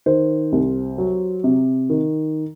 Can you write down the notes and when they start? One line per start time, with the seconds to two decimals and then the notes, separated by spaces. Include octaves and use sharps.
0.06 D#3 C5
0.52 C2
0.98 F#3
1.44 C3
1.90 D#3